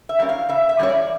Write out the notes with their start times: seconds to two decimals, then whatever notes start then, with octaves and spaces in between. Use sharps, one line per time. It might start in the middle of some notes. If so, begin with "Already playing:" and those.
0.09 E5
0.19 E3 G3 A#3 C#4
0.29 F5
0.49 C#3 E5
0.69 E5
0.79 E3 G3 A#3 C#4 C#5
0.89 D5